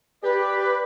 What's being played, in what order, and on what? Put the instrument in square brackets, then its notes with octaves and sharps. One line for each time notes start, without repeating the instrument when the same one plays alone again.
[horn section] G4 D5 [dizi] B4